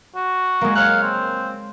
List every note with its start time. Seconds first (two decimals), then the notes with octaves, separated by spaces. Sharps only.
0.15 F#4
0.61 G#3 A#3
0.75 C#5 F5 F6 F#6
1.03 C4